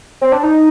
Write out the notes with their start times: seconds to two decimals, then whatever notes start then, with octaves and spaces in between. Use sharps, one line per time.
0.21 C4
0.32 D4
0.43 D#4